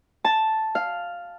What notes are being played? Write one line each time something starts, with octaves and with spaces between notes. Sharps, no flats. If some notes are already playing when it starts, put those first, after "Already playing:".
A5
F5